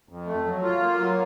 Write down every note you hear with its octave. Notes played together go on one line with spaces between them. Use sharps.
F2
A3
F#3
F4
A#3
F#3